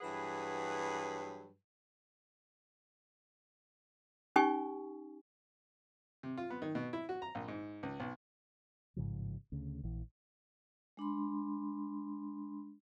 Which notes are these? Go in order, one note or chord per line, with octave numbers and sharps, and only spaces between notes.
G2 E3 F#3 G#4 B4 F#5
C#4 D#4 G4 G#5 C#6
C3
F4
B3
D#3
B2
E4
F#4
A#5
A#1
G#2
C#2
B1
A1 G#2 C#3 F3
D2 C#3
A#1 E3
G#3 D4 B5 C6